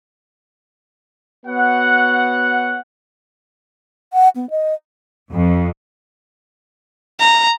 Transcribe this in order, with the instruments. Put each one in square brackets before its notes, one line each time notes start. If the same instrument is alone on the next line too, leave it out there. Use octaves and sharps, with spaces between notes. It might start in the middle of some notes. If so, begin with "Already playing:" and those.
[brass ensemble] B3 F#4 C#5 F#5
[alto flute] F#5
B3
D#5
[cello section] F2
[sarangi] A#5